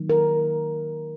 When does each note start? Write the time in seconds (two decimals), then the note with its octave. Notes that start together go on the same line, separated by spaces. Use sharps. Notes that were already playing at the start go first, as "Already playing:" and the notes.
Already playing: D#3 F#3 A#3
0.10 A#4